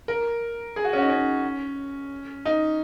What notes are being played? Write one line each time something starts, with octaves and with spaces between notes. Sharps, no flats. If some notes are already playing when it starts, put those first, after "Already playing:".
A#4
G#4
F#4
C#4
F#4
D#4
C#4
D#4